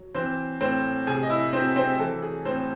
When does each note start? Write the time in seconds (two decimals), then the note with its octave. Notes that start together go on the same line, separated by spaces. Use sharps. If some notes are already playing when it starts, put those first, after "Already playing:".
Already playing: F#3
0.15 E3 C4 C5
0.61 A2 C4 C5
1.07 C3 G#4 G#5
1.23 D#5
1.30 E4 E5
1.53 F#3 C4 C5
1.76 C4 C5
1.99 E3 A4
2.22 G#4
2.45 A2 C4 C5